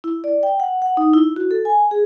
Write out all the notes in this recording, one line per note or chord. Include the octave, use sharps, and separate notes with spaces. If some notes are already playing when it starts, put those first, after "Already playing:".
E4
D5
G5
F#5
F#5
D#4
E4
F#4
A4
G#5
G#4